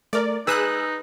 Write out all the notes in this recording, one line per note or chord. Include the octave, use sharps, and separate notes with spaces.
A3 A#4 D5
D#4 G#4 B4 D#6 E6 F#6